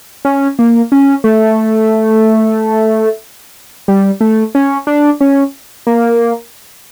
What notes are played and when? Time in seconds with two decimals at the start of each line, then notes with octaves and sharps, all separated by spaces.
0.25 C#4
0.59 A#3
0.92 C#4
1.24 A3
3.88 G3
4.21 A3
4.55 C#4
4.87 D4
5.21 C#4
5.87 A#3